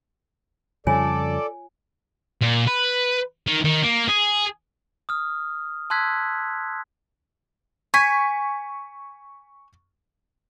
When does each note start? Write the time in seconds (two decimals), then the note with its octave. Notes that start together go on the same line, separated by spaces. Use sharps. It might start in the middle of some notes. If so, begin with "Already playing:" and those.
0.87 F2 C#3 G3 F4 A4 C#5 D5 G#5
2.42 A#2
2.67 B4
3.47 D#3
3.64 D#3
3.83 A#3
4.08 G#4
5.09 D#6 F6
5.90 A5 C6 E6 F#6 G#6 B6
7.94 G#5 C#6 B6